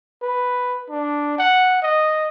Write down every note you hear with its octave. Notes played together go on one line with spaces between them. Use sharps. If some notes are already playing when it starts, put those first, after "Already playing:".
B4
D4
F#5
D#5